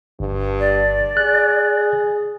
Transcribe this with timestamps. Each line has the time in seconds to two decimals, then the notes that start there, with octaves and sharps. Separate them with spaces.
0.20 G1 G2
0.59 D5
1.17 G#4 F#6